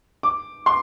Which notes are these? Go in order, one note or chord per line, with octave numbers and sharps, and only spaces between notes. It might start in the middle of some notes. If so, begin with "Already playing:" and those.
D6
C6